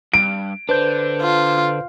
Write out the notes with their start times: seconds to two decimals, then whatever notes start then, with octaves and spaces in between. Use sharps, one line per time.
0.14 G2 D7
0.69 D3 D4 B4 C5 G6
1.22 F4